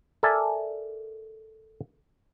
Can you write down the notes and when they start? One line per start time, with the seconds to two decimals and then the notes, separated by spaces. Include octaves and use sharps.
0.23 A4 A#4 D5 E5 G#5 A5